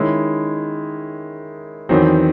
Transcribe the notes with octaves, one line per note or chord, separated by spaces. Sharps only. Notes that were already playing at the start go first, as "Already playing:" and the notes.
Already playing: D#3 G#3 C#4 E4
E2 D#3 F#3 C4